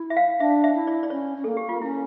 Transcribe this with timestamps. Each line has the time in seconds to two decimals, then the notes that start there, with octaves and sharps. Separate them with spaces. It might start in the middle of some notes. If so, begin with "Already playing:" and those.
Already playing: E4
0.10 E5
0.17 F5
0.40 D4 E5
0.64 E5
0.75 E4
0.87 D5
1.03 D5
1.10 C#4 C#5
1.38 C#4
1.44 A#3 A4
1.57 G4
1.69 F4
1.82 C#4 E4